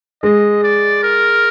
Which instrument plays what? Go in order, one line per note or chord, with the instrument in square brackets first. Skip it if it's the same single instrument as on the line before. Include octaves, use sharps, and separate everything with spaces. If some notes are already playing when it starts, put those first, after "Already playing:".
[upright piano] G#3 [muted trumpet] D#5
[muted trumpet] D5
A#4